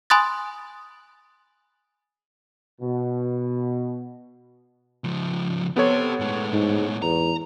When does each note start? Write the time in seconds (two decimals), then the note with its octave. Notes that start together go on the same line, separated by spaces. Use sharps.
0.10 G#5 B5 C6 D#6 F#6 A6
2.81 B2
5.04 C#2 F3
5.76 B3 G4 A4 C5 C#5
6.20 A2 G#3
6.53 G#2
7.02 E2 A#5